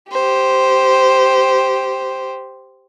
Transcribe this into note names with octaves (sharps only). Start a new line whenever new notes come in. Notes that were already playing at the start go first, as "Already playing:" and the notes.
G4 C5